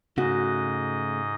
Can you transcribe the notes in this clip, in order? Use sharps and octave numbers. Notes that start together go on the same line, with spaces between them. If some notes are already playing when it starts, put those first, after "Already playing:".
G#2 C#3 A3 F#4 D#5